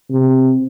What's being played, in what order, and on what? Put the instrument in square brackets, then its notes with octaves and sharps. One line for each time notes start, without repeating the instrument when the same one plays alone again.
[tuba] C3